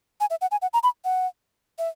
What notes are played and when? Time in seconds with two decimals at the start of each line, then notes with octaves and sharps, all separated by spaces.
0.20 G#5
0.30 E5
0.41 F#5
0.51 G#5
0.62 F#5
0.73 A#5
0.83 B5
1.04 F#5
1.78 E5